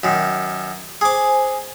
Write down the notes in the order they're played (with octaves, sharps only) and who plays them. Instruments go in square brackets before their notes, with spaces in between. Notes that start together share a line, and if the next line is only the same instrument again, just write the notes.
[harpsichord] F#2 D#3
[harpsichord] G#4 D6 [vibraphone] C5 G#5